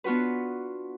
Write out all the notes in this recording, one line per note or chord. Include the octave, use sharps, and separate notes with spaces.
B3 D4 F4 F#4 B4